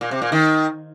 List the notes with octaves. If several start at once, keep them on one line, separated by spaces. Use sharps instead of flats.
A#2
C3
A#2
D#3